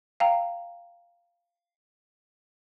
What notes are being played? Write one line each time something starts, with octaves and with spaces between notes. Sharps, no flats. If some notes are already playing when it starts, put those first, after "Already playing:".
F5 G5 A#5